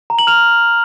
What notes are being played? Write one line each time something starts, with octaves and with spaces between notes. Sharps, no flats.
A#5
F#7
F6 F7